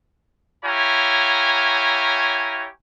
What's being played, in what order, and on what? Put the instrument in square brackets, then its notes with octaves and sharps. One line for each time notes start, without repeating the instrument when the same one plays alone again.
[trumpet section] E4 G4 C#5 F5 G#5 A#5